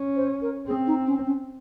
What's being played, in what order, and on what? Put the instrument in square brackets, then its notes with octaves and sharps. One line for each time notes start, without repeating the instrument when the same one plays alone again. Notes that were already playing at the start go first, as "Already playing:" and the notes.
Already playing: [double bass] C#4
[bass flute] C5
A#4
[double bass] C4 [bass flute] G#4
[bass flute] D#4
C#4
C#4